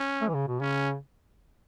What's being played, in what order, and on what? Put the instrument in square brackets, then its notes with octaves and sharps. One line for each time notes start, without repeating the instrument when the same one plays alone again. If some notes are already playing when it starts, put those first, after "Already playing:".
Already playing: [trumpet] C#4
[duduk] A3
E3
C#3
B2
[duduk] C#3 [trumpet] C#4